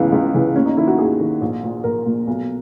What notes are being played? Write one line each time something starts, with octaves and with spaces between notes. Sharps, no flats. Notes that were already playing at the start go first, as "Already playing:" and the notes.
Already playing: C#2 C#3 E3 B3
C#2
C#3 E3
D#2 C#4
D#4
D#3 E4
F#4
D#2 G#4
D#3
A#1
A#2
A#1 A#4
A#2
B1